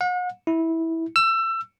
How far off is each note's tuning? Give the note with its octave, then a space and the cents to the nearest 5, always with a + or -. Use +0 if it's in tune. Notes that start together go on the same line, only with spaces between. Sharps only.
F#5 -40
E4 -15
E6 +25